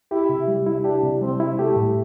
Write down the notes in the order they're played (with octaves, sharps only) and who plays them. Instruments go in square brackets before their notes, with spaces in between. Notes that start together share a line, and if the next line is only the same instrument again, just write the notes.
[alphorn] E4 [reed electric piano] G4
[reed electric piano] C3
G3
E4
[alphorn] D4 [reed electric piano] G4
[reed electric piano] C3
[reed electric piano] G3 [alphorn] C4
[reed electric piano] E4
[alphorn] A3 [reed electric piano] G4
[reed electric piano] A2